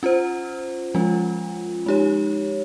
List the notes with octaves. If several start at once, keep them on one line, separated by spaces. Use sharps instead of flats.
C#4 F4 C5
F3 G#3 C#4 F4
G#3 D#4 G4 C#5